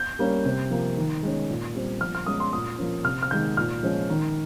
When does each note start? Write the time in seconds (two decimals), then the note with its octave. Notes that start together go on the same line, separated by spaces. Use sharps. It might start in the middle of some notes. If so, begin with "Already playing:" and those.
Already playing: G6
0.19 G3 A#3 C#4
0.46 C3
0.71 F3 A#3
0.97 D#3
1.23 G#3 C#4
1.50 A#2
1.75 G3 C4
2.01 F3 F6
2.15 F6
2.26 G#3 C#4 D#6
2.40 C6
2.53 A#2 D#6
2.78 F3 A#3 C#4
3.05 C3 F6
3.22 F6
3.31 D#3 G#3 G6
3.57 A#2 F6
3.83 F3 G#3 C#4
4.09 D#3